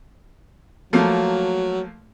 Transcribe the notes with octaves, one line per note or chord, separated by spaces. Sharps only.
F3 F#3 A3 A#3